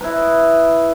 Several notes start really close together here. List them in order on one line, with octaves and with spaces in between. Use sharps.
B4 E4 D#5